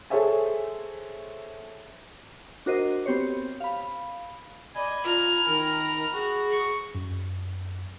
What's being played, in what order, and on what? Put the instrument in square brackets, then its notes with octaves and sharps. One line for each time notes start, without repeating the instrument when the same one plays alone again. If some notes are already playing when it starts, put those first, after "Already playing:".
[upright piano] G#4 A4 C5 C#5 E5 G#5
[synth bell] D4 F#4 A#4 C5 D#5
B3 C4 G4 C5 C#5
F5 B5
[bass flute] D5 [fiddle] D#5 [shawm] G#5 [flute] B5
[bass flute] F4 [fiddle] A#5 F6
[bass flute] D#3 [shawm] A#4
[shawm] F#4 [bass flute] G#4
[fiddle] C#6
[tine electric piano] F#2